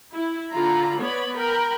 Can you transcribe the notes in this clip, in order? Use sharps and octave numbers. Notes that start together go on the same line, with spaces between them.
E4
D3 F4 A#5 B5
B3 C#5 D5 B5
A#4 G5 B5